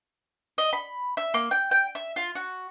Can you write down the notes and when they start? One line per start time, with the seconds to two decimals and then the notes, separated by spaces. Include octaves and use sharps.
0.58 D#5
0.73 B5
1.17 E5
1.34 A#3
1.51 G5
1.71 G5
1.95 E5
2.16 F4
2.35 F#4